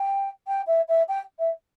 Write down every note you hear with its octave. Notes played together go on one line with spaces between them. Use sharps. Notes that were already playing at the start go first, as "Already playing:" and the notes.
Already playing: G5
G5
E5
E5
G5
E5